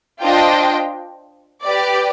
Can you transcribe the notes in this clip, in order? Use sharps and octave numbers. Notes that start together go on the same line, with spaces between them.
D4 F4 C5 D#5 G5
G4 B4 D5